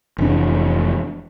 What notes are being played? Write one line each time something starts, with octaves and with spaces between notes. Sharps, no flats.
F1 E3 D4